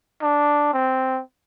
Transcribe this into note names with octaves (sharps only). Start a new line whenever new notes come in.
D4
C4